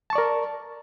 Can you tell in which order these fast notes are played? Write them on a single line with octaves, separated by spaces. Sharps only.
A5 C#6 D5 A#4